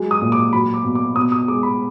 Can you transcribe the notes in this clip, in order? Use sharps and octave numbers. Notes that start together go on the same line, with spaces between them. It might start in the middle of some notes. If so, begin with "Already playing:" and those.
Already playing: F#3 G#3
D#6
A#2
D6
F#3 B5
D6
B2
D6
B2 D#6
D#6
G#3 D6
B5